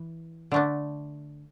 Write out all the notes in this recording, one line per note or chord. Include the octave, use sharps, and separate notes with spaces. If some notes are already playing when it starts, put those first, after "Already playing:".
Already playing: E3
D3 A3 D4